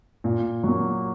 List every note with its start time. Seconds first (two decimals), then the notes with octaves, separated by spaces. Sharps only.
0.24 A#2
0.64 F#3 A#3